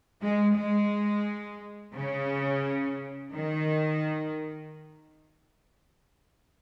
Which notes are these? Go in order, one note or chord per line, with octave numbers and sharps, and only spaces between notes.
G#3
G#3
C#3
D#3